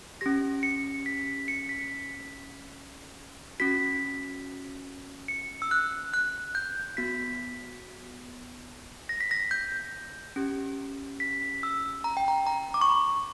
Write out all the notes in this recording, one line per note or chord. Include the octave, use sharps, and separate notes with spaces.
C#4 G4 A#6
C#7
B6
C#7
B6
C#4 F#4 B6
C#7
E6
F#6
F#6
G6
B3 F#4 B6
A#6
B6
A#6
G6
C#4 G4
B6
E6
A#5
G5
A#5
A#5
D6
C#6
B5